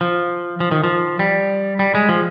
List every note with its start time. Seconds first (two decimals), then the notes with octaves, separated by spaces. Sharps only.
0.01 F3
0.60 F3
0.71 D#3
0.84 F3
1.19 G3
1.79 G3
1.95 G#3
2.09 F3